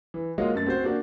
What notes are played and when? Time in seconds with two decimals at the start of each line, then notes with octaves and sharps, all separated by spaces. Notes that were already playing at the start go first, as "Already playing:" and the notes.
0.14 E3
0.38 G#3 A#3 F4 F#4 C#5 D#5
0.54 F#2 A3 A#3 A6
0.66 C4 F#4 C5
0.84 A#3 D4 F#4